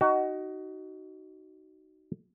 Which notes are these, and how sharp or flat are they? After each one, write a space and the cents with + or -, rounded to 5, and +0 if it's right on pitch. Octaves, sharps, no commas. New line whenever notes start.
D#4 -5 F#4 +25